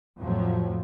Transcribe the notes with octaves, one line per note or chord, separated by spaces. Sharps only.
F2 A2 F3 F#3